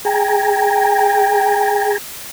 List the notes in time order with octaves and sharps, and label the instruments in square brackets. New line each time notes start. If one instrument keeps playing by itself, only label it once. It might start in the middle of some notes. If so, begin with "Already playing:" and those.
[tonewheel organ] G#4 G#5 A#5 [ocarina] G5